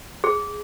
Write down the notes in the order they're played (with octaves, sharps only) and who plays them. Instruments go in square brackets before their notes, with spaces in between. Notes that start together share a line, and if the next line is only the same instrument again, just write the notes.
[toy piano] G#4